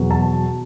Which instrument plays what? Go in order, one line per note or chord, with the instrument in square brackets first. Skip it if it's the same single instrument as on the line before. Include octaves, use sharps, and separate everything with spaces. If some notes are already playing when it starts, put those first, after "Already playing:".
Already playing: [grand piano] E2 B2 F#3
A5